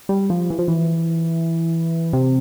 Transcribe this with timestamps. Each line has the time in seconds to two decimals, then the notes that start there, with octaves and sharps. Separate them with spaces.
0.09 G3
0.30 F3
0.50 E3
0.59 F3
0.68 E3
2.13 C3